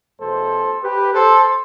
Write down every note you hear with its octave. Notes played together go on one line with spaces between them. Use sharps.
E2 B2 A3 A4 C5
G4 B4
A4 C5